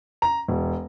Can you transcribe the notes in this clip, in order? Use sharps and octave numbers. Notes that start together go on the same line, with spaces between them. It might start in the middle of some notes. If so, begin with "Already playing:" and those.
A#5
E1